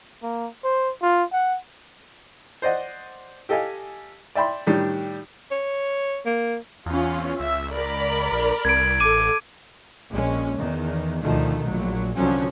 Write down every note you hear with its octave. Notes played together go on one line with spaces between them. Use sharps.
A#3
C5
F4
F#5
C5 D5 D#5 F#5
G4 A4 D#5 F5 G#5
D5 E5 G5 B5 C6
A2 D#3 G3 D4
C#5
A#3
E2 C#4 F4
C#2 E5
C#2 A#4 D5 B5
A#1
C2 G#6 D7
A1 A4 D6 D#7
A#1 G#3 C#4
E2 D#3
D2 B2 D#3 F3 A3
A#1 F#3
C2 D3 F3 F#3 C#4